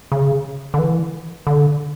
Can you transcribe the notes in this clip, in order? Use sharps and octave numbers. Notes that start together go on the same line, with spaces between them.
C#3
D3
E3
D3